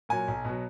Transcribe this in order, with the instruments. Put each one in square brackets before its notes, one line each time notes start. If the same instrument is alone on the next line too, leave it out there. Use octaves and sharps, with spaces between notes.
[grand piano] A#2 F#3 G#5
B1
B2 F#3